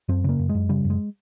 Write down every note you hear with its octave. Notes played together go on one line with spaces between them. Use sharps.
F#2 C4
C#3 A#3
F#2
G#3
F#2
C#3 G3
F#2
G#3